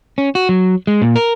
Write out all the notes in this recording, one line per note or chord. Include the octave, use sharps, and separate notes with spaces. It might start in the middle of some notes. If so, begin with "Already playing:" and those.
C#4
F#4
F#3
G#3
A#2
A#4